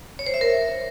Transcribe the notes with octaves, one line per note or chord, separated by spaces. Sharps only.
C#5
C5
E5
A#4